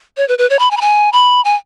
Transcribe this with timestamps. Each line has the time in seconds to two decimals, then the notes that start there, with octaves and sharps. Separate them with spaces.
0.17 C#5
0.28 B4
0.38 B4
0.50 C#5
0.59 B5
0.71 G#5
0.77 B5
0.81 G#5
1.13 B5
1.45 G#5